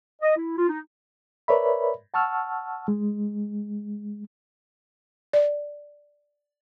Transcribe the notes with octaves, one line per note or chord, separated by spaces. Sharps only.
D#5
E4
F4
D#4
A#4 B4 C#5 D5 E5 B5
F#5 A5 C#6 E6 F6
G#3
D5